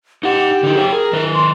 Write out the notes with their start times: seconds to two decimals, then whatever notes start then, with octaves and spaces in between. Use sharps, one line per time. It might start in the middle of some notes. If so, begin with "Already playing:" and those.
0.23 D#4 G4 F#5
0.63 D3 D#4
0.76 G#4 C#5 G5
0.93 G#4 A#4
1.13 D#3 B4
1.34 C6